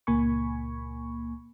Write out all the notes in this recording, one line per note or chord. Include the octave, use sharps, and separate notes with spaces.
C#2 A#2 A#3 G#5 B5 C#6